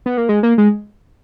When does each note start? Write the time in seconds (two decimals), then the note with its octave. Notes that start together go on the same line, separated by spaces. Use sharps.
0.06 B3
0.18 A#3
0.29 G#3
0.43 A#3
0.58 G#3